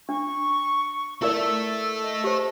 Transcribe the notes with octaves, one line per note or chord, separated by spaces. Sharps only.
D4 C#6
E4 A4 A#4 D5 E5 E6
D#5
G4 C5